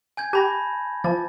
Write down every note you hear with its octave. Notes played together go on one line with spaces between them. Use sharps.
G#5 G6 G#6
G4 A5 B5 A#6
F3 A5 A6